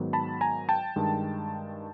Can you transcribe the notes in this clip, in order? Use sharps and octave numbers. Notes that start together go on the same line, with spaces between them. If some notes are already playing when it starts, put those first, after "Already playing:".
Already playing: G#2 D#3 F#3 B3
A5 B5
G#5 A#5
G5 A5
G2 D#3 G#3